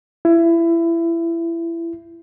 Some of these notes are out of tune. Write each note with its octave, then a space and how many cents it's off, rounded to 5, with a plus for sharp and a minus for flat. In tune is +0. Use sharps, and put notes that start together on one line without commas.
E4 +25